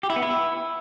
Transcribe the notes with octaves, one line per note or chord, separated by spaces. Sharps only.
G4
E4
B3
E4